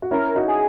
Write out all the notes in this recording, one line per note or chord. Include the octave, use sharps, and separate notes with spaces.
F#4
C#4 E4 A#4
D#4 F#4
G#4